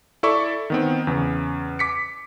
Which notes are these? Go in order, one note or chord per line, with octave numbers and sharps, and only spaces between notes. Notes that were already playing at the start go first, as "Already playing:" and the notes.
E4 A4 D5 E5 C#6
D#3 B3 C4
E2 C#3
D6 B6 C#7